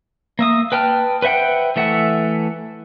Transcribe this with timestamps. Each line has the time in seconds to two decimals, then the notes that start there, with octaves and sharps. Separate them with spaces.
0.39 A#3 E5 D#6
0.72 B4 G5 A5 F6
1.22 B4 C5 E5 F#5 G5
1.76 E3 A3 E5 F#5